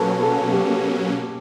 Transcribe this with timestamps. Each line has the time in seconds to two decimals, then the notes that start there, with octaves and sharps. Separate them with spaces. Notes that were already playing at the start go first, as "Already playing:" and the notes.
Already playing: B2 F#3 A#3 C#4 A4 B4
0.22 A4 B4
0.52 G4 A4